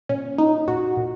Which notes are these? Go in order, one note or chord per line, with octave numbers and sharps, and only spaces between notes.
A#2 C#4
A#2 D#4
A#2 F#4
A#2